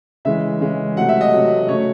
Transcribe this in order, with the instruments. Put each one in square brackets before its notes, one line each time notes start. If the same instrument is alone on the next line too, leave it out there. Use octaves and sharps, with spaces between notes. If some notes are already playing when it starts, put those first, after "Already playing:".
[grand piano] C#3 E3 G#3 E5
C#3 E3 G#3
C3 F#3 A3 F#5
E5
D#5
C3 F#3 A3
C#3 F#3 A3 C#5